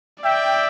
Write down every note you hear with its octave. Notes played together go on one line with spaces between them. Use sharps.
D5 E5 G5